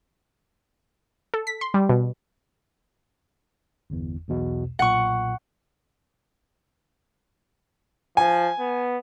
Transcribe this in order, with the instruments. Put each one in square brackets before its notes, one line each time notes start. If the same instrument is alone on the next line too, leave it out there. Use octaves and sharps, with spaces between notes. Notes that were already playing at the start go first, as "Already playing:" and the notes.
[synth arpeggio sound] A4
B6
C6
G3
B2
[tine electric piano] G1 E2
B1 E2 B2
[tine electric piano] B1 A#2 [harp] F#5 C#6
[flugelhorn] F3 [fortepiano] G#5
[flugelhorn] B3